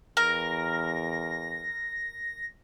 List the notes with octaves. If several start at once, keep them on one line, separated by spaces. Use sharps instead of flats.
E2 A#4 A#6